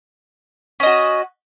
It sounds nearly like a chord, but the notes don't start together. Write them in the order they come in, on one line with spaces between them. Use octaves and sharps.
C#4 D#5 F#4